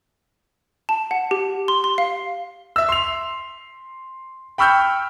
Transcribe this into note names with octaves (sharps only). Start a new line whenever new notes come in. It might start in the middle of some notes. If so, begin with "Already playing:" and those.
A5
F#5
G4
C6
C6
F5
E5 E6
C6 F7
G5 B5 C#6 E6 F6 G6